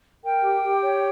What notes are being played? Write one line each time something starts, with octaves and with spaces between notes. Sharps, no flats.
A#4 G5
G4
G4
C#5